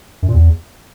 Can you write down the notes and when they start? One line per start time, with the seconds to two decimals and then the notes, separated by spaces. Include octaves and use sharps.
0.22 F#2
0.28 A#2
0.34 E2